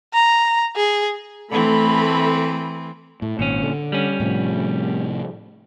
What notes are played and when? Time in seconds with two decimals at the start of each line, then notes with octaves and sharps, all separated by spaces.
0.13 A#5
0.76 G#4
1.51 E3 A3 C4 B5
3.22 A2
3.39 G#1 A#2 C#4
3.63 D3
3.92 G3 C#4
4.20 A2 C3 F3